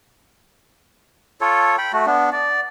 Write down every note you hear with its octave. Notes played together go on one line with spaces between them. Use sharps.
F4 A4 C#5
G5 B5
A3 F#4
B3 D4
D5